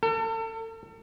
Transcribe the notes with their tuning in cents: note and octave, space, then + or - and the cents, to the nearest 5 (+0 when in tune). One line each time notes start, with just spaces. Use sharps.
A4 +35